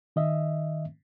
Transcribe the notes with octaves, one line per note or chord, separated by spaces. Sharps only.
D#3 D#5 E5